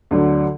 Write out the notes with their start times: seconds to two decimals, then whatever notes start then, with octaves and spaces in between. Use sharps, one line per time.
0.11 D2 D3 F#3